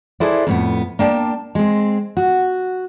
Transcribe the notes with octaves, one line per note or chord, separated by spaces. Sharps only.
E4 G#4 A4 B4 C5 D5
F2 A2 B3
A#3 D4 G5 A5
G#3 C4
F#4